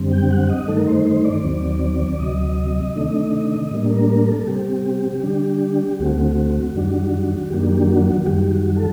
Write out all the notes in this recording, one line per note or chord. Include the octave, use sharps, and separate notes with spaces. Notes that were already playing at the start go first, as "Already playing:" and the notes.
Already playing: F#2 D3 G3 C4
G5
F#5
D#5
G2 D#3 A3 D#4 A4
A#4
C5
C5
D5
D#2 D#3 F#3 C4
D2 C3 F#3 D#5
C3 D#3 A3 D4
A2 G3 A#3 D4
A#4
A#4
A4
C3 G3 C4 G4
D3 G3 D4
D2 D3 A3 C4 F#4
F#2 D#3 G3 D4
F#2 D#3 F#3 A#3 D4 G4
G4
F#4
F#4
F#2 D#3 G3 G4
G4
F#4
A4